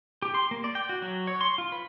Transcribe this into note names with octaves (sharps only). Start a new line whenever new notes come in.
G4
C6
A#3
D5
G5
F#4
F#3
C#5
C6
F4
B4